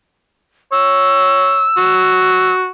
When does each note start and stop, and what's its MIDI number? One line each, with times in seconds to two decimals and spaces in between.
0.72 1.67 73
0.72 2.54 88
1.77 2.70 66